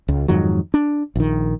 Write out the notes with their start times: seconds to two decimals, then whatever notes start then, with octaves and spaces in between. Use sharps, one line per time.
0.08 C#2
0.28 F2 G#2 D#3 F#3
0.74 D4
1.16 A#1 D#3